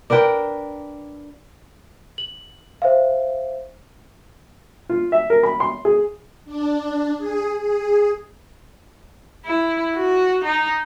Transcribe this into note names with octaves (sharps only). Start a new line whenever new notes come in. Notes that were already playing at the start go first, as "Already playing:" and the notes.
D4 A#4 B4 G5
F#7
C5 E5 F5
F4
E5
A#4
B5
C6
G#4
D4
G#4
G#4
E4
F#4
D#4